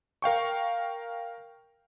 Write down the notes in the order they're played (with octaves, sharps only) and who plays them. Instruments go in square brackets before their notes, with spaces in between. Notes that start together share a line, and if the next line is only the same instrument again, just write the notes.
[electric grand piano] A#4 F5 G5 C#6